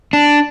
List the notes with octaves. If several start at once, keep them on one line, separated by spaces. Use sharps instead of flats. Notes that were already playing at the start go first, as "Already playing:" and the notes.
D4